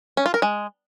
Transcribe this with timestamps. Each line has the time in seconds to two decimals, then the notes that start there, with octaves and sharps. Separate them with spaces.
0.17 C#4
0.26 F4
0.34 A#4
0.42 G#3